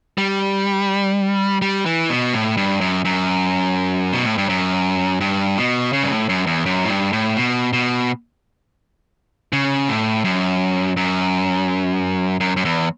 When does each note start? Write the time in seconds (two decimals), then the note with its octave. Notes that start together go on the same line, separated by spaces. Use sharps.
0.18 G3
1.62 G3
1.86 E3
2.10 B2
2.33 A2
2.57 G2
2.81 F#2
3.05 F#2
4.13 B2
4.25 A2
4.38 G2
4.49 F#2
5.21 G2
5.57 B2
5.93 C#3
6.03 G2
6.10 A2
6.29 F#2
6.47 E2
6.66 F#2
6.85 A2
6.89 G2
7.13 A2
7.37 B2
7.73 B2
9.53 C#3
9.88 A2
10.24 F#2
10.97 F#2
12.40 F#2
12.57 F#2
12.65 E2